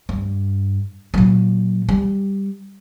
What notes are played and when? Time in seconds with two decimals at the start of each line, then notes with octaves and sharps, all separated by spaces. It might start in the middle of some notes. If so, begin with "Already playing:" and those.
0.09 G2
1.14 A#2 F#3
1.89 G3